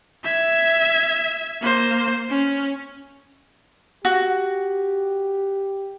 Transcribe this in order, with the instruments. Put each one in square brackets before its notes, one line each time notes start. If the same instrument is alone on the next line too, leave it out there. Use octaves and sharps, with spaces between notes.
[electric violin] E5 G#6
A#3 C5
C#4
[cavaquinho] F#4 [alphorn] G4